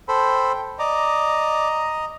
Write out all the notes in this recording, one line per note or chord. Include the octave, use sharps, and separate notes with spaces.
A4 C5 G5 B5
D5 D#5 A#5